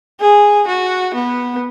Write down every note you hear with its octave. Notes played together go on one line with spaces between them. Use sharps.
G#4
F#4
B3